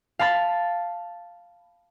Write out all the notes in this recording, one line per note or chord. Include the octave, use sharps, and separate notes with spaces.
F5 A5 B5 A6